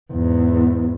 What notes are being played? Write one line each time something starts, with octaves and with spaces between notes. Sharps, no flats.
E2 G#2